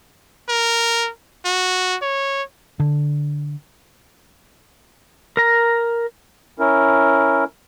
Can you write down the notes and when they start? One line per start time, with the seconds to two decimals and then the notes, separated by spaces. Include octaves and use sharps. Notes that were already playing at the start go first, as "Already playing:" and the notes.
0.49 A#4
1.45 F#4
2.02 C#5
2.80 D3
5.37 A#4 A#5
6.60 C#4 E4 A#4